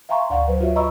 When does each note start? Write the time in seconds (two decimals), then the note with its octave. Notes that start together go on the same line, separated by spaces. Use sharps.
0.09 E5 F5 G#5 A#5 C6 C#6
0.30 D2 G#2 D5 F5 F#5 C#6
0.48 F#3 B4 C5
0.60 F4 F#4 C#5 E5
0.76 D#5 A#5 B5 C#6 E6